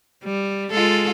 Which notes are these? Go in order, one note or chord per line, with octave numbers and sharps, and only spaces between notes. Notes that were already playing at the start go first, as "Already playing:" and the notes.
G3
G#3 F4 A4